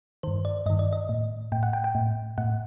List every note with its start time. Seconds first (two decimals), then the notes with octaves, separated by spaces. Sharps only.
0.23 G2 D#3 C5
0.45 D5
0.66 G2 D#3 D#5
0.79 D5
0.93 D#5
1.09 A2
1.52 A2 G5
1.63 F#5
1.73 G5
1.84 G5
1.95 A2
2.38 A2 F#5